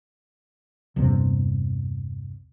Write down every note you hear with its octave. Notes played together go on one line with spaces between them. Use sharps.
A#1 E2 G2 C3